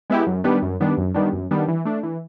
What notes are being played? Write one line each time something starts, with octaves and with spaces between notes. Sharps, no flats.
G#3 B3 E4 G4
F#2
D#3 G3 B3 D4
F#2
D#3 G3 B3 D4
F#2
D#3 G3 B3 D4
F#2
D#3 G3 B3 D4
E3
A3 D4
E3